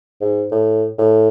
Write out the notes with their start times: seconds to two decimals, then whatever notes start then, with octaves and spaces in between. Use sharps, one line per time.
0.21 G#2
0.52 A2
0.98 A2